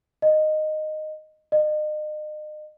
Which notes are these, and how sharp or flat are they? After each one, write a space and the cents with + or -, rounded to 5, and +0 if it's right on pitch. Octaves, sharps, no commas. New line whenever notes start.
D#5 -10
D#5 -35